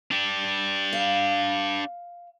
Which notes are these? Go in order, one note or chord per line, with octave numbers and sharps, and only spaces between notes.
D4 G4
F5